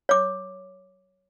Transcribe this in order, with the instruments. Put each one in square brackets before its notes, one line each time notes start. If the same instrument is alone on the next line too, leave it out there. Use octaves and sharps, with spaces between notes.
[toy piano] C#5 D6